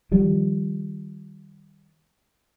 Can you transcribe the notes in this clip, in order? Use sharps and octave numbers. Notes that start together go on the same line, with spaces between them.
D#3 F3 G3